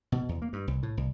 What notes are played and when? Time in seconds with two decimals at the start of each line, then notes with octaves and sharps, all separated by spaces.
0.12 B2
0.29 E2
0.42 A#3
0.53 G2
0.67 C2
0.83 A2
0.97 C2